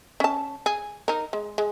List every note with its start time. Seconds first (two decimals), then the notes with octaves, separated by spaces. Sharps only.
0.20 C#4 A5
0.66 G#4
1.08 D#4 A#4
1.33 G#3
1.58 G#3